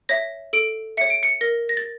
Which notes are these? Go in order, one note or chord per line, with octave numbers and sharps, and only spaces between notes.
C#5 E5 A#6
A4 D7
C#5 E5 C#7
D7
C#7
A#4 A#6
A#6
A6